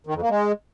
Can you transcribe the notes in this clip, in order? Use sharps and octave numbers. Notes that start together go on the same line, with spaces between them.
D#3
F2
A#3
G#3